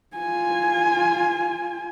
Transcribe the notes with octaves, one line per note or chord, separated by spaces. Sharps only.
F4 G#5